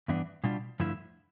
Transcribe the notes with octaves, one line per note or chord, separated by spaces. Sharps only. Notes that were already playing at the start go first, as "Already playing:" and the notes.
G2 E3 B3 D4
B2 G3 D4 F4
G2 D3 F3 A3 E4